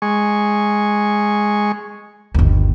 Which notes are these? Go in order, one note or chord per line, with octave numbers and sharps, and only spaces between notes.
G#3 C#6
G1 D#2